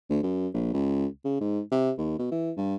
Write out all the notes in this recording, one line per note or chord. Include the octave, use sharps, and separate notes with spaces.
D2
F#2
A#1
C#2
C#3
G#2
C3
D#2
B2
E3
G2